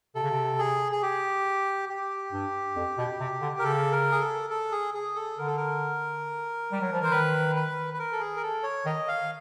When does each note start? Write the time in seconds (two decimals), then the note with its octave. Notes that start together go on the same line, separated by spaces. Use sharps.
0.15 C3 A4
0.22 C#3
0.31 C3
0.59 G#4
0.92 G#4
1.02 G4
1.89 G4
2.32 G2
2.76 F2
2.98 B2
3.20 C3
3.42 D3
3.59 A#4
3.63 C#3 A4
3.92 A#4
4.11 G#4
4.20 A4
4.50 A4
4.72 G#4
4.94 G#4
5.16 A4
5.38 D3 A#4
5.47 A4
5.56 A#4
6.72 G3
6.81 F#3
6.92 F3
7.01 E3 C5
7.11 D#3 B4
7.55 B4
7.94 B4
7.99 A#4
8.12 A4
8.20 G#4
8.36 A#4
8.43 A4
8.63 C#5
8.85 D#3 D#5
9.08 F5